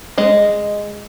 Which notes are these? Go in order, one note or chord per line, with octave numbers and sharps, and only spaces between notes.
G#3 D#5